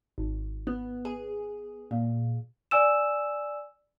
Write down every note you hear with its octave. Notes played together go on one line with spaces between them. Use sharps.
G#1
B3
G#4
A#2
D5 G#5 E6 E7